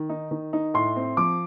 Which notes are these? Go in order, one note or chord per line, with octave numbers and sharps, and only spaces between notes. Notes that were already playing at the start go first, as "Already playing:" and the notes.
Already playing: D#3
D#4
D#3
D#4
A2 C6
C4
F3 D6